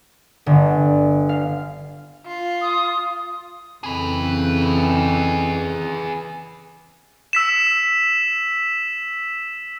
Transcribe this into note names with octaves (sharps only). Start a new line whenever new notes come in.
G1
F5
F4
D#6
F2 C#3 E3 G#4 B4
E6 B6 E7